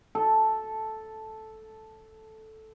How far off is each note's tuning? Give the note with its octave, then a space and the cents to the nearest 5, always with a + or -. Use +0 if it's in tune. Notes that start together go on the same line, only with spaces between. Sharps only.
A4 -5